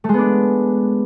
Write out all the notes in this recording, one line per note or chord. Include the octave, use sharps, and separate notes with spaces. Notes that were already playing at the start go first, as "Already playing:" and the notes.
G#3 A3 B3 D4